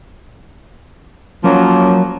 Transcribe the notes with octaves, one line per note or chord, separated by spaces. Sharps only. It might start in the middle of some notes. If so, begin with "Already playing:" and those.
F3 F#3 A#3 C#4